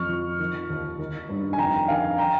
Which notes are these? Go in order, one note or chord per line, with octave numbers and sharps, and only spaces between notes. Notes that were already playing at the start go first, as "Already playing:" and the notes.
Already playing: F2 C#6 F6
F3
D#3
D#2
D#3
G2
G#5
F2 G5 A#5
D#3 F5 G#5
G5 A#5